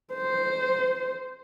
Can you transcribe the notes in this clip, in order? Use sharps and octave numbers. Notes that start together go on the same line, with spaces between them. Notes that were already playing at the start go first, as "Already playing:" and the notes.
C5